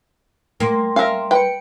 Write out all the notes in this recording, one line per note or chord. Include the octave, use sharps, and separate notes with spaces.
G3 A#3 C6
C#4 A#4 E5 F5
B4 G5 C#7